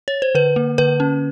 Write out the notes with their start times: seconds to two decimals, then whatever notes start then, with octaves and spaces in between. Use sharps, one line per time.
0.08 C#5
0.22 C5
0.35 D3 B4
0.56 A#3
0.78 D3 B4
1.00 C#4